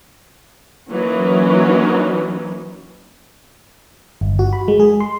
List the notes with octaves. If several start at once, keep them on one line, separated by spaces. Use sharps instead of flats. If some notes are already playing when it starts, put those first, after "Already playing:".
E3 F#3 A#3 C#4 D#4
G1
F#4
B5
G#3
G#4
C6